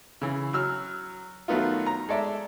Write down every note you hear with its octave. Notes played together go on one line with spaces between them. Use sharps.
C#3 E3
F#3 E6 F6
D#3 F#3 A3 B3 D#4 F4
A#5
G#3 A4 D5 E5